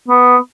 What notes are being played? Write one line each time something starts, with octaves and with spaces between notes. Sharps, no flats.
B3